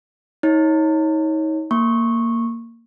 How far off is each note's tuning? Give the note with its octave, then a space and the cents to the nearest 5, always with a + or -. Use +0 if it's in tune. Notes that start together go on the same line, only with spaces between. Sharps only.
D#4 +35 C#5 -10
A#3 -15 C#6 -15